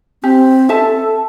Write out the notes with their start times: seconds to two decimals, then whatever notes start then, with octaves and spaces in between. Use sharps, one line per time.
0.23 C4 G4
0.69 A4 E5 A5